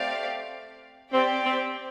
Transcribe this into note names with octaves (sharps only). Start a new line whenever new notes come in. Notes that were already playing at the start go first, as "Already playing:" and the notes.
Already playing: A3 C4 G4 D5 F5
C4 G4 D5 G5
C4